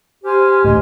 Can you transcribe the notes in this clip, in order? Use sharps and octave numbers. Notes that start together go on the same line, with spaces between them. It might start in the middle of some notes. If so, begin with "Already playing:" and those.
G4 C5 G#5 F6
D2 A2 C5 D#5 C6